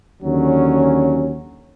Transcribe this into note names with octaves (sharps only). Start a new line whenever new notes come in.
D#2 D3 F#3 C#4